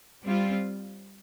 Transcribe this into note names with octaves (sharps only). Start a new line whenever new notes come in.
G3 C4 F4